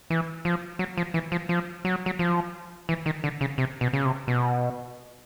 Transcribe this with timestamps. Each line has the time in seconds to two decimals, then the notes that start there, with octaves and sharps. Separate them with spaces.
0.10 E3
0.45 F3
0.79 F#3
0.98 F3
1.14 E3
1.32 F3
1.49 F3
1.85 F#3
2.06 F#3
2.19 F3
2.89 E3
3.06 D#3
3.24 D3
3.41 C#3
3.58 C3
3.81 B2
3.93 C#3
4.05 C3
4.28 B2